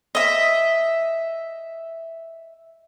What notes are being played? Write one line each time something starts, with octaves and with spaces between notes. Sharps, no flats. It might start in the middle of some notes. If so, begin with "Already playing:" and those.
D#5 E5